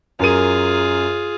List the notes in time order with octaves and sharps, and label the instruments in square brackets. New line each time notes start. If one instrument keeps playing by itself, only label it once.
[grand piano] F#2 A#4 D#7 [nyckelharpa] F4 G#4